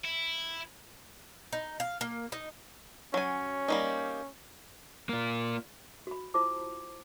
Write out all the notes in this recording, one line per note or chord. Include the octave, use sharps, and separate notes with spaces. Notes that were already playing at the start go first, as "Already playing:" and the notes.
E4
D#4
F5
A#3
D#4
F#3 C#4 G#5
G3 A#3 D#4
A#3 F4
F#4 B5
E4 F4 C5 A5 D6